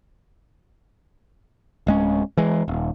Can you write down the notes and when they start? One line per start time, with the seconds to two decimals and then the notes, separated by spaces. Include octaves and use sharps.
1.87 D1 G#3 C#4
2.37 E3 G#3
2.68 D#1